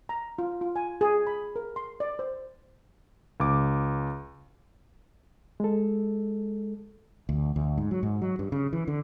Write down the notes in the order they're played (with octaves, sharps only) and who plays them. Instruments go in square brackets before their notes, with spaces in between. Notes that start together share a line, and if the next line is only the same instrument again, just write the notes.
[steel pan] A#5
F4
F4
G#5
G#4
B5
A#4
C6
D5
C5
[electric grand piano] C#2 D6
[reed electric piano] G#3 A4
[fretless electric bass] D2
D2
G#2
F#3
G#2
F#3
G2
C#3
E3
D3